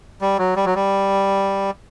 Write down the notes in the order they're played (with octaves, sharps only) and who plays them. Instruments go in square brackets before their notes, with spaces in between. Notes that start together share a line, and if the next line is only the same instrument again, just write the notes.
[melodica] G3
F#3
G3
F#3
G3